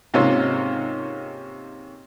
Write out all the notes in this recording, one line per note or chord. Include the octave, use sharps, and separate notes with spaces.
G#2 C3 A#3 C4 C#4 F4